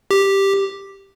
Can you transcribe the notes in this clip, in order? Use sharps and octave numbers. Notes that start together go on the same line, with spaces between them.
G4